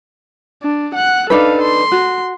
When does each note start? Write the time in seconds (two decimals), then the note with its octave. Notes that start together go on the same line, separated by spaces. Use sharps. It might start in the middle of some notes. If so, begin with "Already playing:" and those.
0.63 D4
0.95 F#5 F#6
1.30 D4 D#4 A4 B4 F5
1.62 C6
1.92 F#4